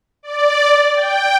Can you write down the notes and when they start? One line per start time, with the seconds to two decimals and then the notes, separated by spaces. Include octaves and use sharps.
0.23 D5
0.94 G5